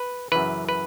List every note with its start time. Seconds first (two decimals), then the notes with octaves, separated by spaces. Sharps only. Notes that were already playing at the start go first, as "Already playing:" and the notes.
Already playing: B4
0.32 F#2 C#3 E3 B4
0.69 B4